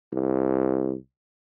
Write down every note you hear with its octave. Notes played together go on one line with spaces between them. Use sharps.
C2